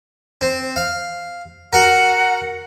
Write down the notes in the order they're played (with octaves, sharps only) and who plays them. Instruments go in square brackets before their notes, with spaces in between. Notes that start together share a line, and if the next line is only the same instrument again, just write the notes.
[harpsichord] C4
F5
[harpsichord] F#4 A#4 [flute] F#5